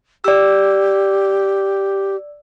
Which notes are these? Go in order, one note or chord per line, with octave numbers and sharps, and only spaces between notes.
G4 D5 E6